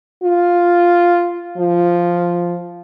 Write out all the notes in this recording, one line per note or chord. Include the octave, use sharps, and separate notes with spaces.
F4
F3